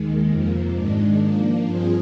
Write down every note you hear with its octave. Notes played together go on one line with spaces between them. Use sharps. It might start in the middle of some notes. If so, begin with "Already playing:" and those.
Already playing: D#2 D#3 G#3
F2 C3 F3 A#3
G#2 D#3 G#3 D4
F3 A#3 D4
G2 F3 C4 F4 G#4